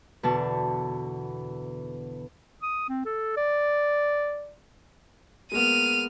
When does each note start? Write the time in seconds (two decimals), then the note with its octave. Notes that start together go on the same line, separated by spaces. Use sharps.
0.23 E2 B2 D3 B3 F#4 A5
2.62 D#6
2.89 C4
3.06 A4
3.37 D5
5.52 G#3 A#3 B3 F6 D#7